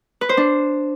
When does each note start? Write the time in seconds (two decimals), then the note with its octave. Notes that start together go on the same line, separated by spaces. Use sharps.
0.21 B4
0.29 C5
0.37 D4